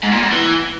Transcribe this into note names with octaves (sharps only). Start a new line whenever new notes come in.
G#2
A#2
E2
E3